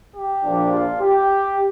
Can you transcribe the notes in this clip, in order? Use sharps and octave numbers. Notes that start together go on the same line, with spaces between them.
G4
A#1 A#2 F3 D4
F4
G4